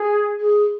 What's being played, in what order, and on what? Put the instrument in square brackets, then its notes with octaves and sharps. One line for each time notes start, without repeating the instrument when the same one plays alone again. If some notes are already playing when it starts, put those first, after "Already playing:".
Already playing: [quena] G#4
[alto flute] G#4